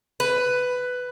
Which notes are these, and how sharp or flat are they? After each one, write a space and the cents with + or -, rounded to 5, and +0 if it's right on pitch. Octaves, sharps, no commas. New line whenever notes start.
B4 +10